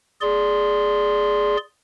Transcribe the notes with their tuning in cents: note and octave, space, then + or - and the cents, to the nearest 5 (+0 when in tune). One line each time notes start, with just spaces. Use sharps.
G#4 +0 D5 +0 C6 +0